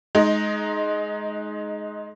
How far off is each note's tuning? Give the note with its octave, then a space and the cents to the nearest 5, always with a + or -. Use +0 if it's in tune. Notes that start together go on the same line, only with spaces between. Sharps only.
G#3 +20 D#4 +0